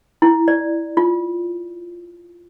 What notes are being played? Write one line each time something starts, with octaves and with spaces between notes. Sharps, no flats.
E4
D5
F4